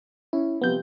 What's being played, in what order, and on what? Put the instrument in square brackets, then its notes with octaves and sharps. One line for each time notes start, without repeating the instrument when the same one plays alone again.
[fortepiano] C#4 [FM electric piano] E4
[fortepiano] C3 F3 G3 [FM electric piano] B3 G6